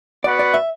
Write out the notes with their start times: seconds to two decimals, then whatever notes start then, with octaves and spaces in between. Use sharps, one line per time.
0.24 B3 F#4 B4 D5 F#5
0.39 D5
0.54 E5